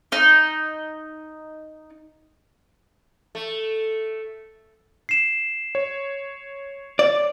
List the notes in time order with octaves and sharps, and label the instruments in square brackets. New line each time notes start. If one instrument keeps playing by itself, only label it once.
[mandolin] D#4 D#5
[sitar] A3
[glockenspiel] C7 E7
[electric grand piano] C#5
[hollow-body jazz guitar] D5